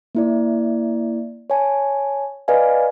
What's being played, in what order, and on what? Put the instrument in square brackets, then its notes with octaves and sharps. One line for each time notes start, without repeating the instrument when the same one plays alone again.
[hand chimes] A#3 E4 D5
C#5 G#5 A5
B4 D5 D#5 F5 G#5